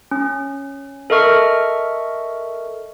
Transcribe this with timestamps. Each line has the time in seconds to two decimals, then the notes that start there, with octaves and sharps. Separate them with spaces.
0.11 C#4
1.10 A4 A#4 D#5 E5 C#6 F6